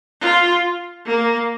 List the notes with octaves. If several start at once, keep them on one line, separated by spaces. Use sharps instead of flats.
F4
A#3